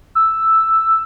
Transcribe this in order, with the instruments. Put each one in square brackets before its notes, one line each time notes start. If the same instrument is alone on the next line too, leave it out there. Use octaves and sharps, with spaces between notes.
[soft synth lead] E6